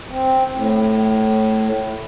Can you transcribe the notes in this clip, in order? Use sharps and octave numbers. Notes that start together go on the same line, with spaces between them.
C4
A2